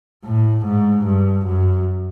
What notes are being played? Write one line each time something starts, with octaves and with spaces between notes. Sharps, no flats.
A2
G#2
G2
F#2